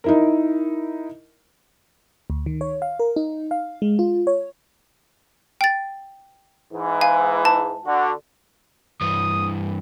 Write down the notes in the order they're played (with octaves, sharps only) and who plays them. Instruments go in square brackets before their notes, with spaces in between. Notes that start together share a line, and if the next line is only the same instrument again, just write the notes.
[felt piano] D#4 E4 A#4
[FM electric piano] D2
D#3
C#5
F5
A#4
D#4
F5
G#3
F4
C#5
[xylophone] G5 A6
[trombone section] G#2 E3
[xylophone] F5 G#5
A5
[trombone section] D3 F#4
[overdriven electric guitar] G2 E3 [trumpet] D#6